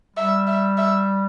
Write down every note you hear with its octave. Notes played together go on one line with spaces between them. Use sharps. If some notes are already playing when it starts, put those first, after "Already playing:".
G3 E5
E5
E5